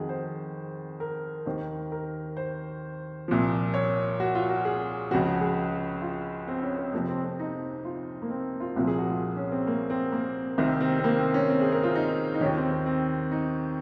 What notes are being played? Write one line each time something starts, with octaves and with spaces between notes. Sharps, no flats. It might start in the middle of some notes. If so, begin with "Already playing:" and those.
Already playing: F2 D#3 F#4 G#4
C5
A#4
D#2 D#3 C5
A#4
C5
C2 A#2 F3
C#5
F#4
F4
F#4
G#4
C#2 C#3 F3 F#4
F#4
G#4
F4
C4
C#4
C4
F2 C3 F3 A#3
C4
C4
D#4
F4
A#3
C4
F4
C2 A#2 F3 F#4
G#4
F#4
F4
C#4
C4
A#3
C4
A#3
C2 C3 D#3 C4
C4
C4
A#3
C4
C#4
C4
G#4
A#4
F4
D#4
D#4
D#2 D#3 C#4
C4
C4
C4
D#4